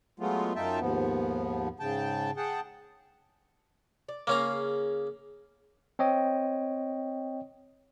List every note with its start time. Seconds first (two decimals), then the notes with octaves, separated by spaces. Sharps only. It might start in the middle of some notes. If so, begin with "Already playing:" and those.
0.20 F#3 G#3 A3 B3 F4
0.56 F#2 D#4 F4 E5 G5 A5
0.80 D#2 G#2 F3 B3
1.80 G#2 C#3 G5 A5
2.37 G#4 F#5 G5 A5
4.09 D5
4.27 C#3 A#3 C#4 G#4 F5 A#5
5.99 C4 C#5 D#5 G5